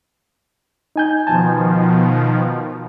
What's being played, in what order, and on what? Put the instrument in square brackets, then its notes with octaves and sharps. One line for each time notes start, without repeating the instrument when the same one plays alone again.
[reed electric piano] D#4 G#5 G6
[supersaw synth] B2 D#3 F3 [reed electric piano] G#5 A5